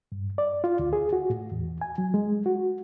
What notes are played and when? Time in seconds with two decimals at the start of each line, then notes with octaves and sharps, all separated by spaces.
0.12 G2
0.38 D5
0.64 F4
0.79 D2
0.93 G#4
1.13 F#4
1.30 A2
1.52 E2
1.82 G#5
1.98 F#3
2.14 G#3
2.46 F#4